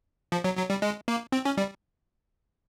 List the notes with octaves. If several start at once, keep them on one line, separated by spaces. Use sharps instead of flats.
F3
F#3
F#3
G3
G#3
A#3
C4
C#4
G3